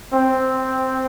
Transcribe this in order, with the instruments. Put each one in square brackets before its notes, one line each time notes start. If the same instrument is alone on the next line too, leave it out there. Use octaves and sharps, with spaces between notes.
[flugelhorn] C4